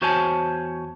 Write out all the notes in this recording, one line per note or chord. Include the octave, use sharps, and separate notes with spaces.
E2 F#4 C5 C#5 G#5 A5